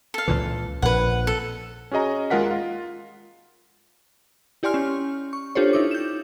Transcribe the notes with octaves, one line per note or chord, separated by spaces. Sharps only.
A4 F5
C#2 A#2 E3
A#1 A#2 B4 F#5
A4
C#4 F#4 G#4 D#5 A#5
D#2 G#3 F4 A#4 F#5 B6
F4
E4 G4 D5 G#5 C6 F6
C#4
C#6
D4 F4 G4 A4 C5 C#5
D#4 E4 D6
G6 E7